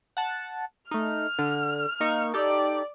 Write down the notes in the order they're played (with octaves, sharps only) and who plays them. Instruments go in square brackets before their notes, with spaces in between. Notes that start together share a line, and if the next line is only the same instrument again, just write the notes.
[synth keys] F#5 A5
[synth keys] A3 D#4 [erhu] F6
[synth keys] D3
A#3 D#4 C#6
[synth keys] D#4 G4 A4 [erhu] D5